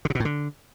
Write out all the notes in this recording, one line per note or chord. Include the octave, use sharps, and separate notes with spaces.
D3
C3
B2
A2
D3